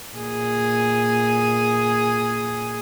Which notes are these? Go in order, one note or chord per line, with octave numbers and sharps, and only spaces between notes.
A#2 G#4